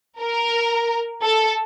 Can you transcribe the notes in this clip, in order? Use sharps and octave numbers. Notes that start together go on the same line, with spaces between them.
A#4
A4